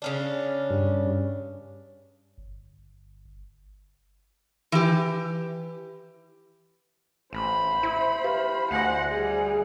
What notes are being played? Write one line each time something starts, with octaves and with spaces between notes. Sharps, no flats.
C#3 C#4 D4
G2
G1
E3 G4
A1 C5 B5
E4
G4 B4 F5
D2 A3 C5 F#5 G#5 A#6
G3 G#4